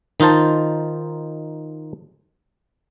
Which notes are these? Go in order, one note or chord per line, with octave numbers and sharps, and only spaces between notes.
D#3 D#4 F4 C5 A5